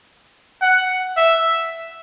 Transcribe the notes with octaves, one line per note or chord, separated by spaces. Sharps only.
F#5
E5